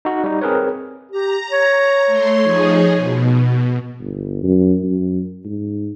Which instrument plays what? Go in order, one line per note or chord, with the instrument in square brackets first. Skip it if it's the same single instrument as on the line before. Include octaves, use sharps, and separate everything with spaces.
[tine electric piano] D#4 F#4
G3 D#4
C4 G#4 A#4 B4 C#5
[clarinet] G4 [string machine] A#5
[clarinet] C#5
[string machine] A3 C6
F3 D#4 G#4
B2
[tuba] G1
F#2
F#2
G#2